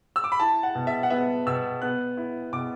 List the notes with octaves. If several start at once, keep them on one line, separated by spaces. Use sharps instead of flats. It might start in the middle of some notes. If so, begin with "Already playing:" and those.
E6
D6
B5
E4 A5
F#5
B2
E5
F#5
B3 E5
B2 E6
B3 F#6
E4
B2 D6